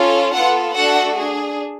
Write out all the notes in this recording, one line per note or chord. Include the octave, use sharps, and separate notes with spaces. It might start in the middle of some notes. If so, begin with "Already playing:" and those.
Already playing: C#4 F4 A4
B3 F4 A4 F#5
A3 D4 F#4 A4 F#5
D4 G#4